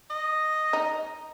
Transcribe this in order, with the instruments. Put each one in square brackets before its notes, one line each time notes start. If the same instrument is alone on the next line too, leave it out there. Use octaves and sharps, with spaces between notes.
[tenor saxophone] D#5
[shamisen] D#4